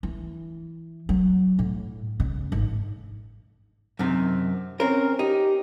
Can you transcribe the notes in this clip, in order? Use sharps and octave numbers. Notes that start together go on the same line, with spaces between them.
E3
F#3
A2
C#3
G#1
F#2 C3 D#3
C4 C#4 A#4
D#4 G4